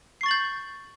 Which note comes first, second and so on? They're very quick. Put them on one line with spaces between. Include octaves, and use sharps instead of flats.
C7 C#6 A6 F#7 G6